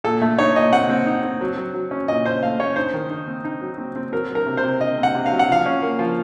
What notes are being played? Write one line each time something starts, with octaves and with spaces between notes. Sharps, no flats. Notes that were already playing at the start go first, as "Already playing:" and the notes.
A#2 A4
A3
D#4 C#5
A#2 D#5
C4 F#5
C4
D#4
C4
F#3
F#3
F#3
C#4
A#2 D#5
C#4 C5
A3 F5
C#4 C#5
D#4 C5
D#3
D#4
C4
D#4
F#3
C4
C4
F#3 A#4
F#3
A#4
C3
C5
C3
C3 D#5
C4
F#5
C3
F5
F#3
F#5
F3 F5
C#4
A#3
F3